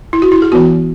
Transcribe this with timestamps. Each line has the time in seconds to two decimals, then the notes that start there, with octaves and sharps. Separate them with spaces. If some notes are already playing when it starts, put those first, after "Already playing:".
0.13 E4
0.22 F#4
0.32 E4
0.42 G#4
0.52 E3 B3 F#4